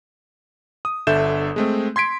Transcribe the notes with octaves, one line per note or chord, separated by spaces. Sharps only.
D#6
G1 D3 A4 E5 G6 E7
G#3 A3 C4
C6 G#6 B6 D7